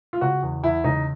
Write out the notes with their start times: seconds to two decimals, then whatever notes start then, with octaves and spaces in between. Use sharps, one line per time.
0.13 F4
0.21 C#3 F#4
0.42 E2
0.63 E2 E4
0.84 C#3 D#4